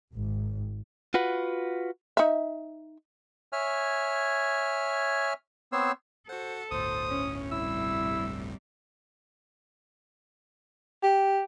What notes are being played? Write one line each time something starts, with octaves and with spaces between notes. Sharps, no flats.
G#1
F4 F#4 B4 F#5
D#4 E5
C#5 E5 G#5 F6
B3 C4 C5 C#5 C6 E6
F#4 A4 C5 F#5
G1 D2 A2 C5 D#6
C#4
C3 G3 E4 E6
G4